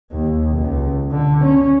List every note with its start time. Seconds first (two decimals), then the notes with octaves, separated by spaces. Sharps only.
0.12 D#2
0.58 C#2
1.11 D3
1.45 C#4